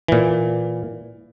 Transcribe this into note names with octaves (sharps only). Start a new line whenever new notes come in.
A#2 E3